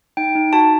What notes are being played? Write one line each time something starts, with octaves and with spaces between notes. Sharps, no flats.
D#4 G5
D#4
F#4 A5